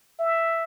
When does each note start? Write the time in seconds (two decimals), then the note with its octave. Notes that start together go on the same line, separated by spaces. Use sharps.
0.19 E5